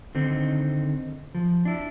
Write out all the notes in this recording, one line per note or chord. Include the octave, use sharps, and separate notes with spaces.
D3 D#3 C4 D#4
F3
D4 E4